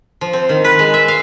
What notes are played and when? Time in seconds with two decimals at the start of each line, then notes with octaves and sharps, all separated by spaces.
0.21 F3
0.33 C4
0.49 D#3
0.64 B4
0.79 G#3
0.94 E5
1.08 F5